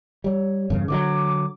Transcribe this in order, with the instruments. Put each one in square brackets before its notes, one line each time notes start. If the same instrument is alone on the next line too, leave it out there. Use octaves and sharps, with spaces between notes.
[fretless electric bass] G3 [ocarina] C#5
[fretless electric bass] E2 G2 C#3
[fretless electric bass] D3 D#3 F#3 [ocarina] D6